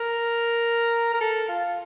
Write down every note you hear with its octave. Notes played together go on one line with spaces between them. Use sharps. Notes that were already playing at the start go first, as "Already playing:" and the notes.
Already playing: A#4
A#4
A4
F4